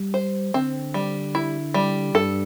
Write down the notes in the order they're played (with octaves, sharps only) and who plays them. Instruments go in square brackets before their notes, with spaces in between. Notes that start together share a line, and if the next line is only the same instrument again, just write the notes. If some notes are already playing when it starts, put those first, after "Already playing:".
Already playing: [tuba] G3
[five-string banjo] C5
[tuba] D3 [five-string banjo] C4
[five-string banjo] G3
E4
G3
[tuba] G2 [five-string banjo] A4